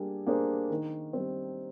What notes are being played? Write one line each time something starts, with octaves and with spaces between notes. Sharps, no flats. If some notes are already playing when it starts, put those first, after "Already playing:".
Already playing: G3 A#3 D4 G#4
A#3 D4 G#4 C5
D#3
G3 C4